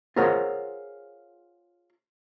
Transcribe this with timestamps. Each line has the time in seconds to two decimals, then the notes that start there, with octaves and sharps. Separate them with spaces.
0.16 F4 G#4 A#4 C5 C#5 F#5